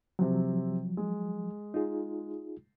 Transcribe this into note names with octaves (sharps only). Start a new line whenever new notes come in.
C3 F3 F#3 C4
G#3
D#4 F4 G#4